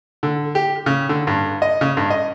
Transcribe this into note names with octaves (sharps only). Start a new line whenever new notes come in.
D3
G4
C#3
D3
G2
D#5
C#3
G2
D#5